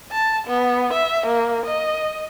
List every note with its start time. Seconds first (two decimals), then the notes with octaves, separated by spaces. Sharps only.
0.12 A5
0.47 B3
0.93 E5
1.26 A#3
1.66 D#5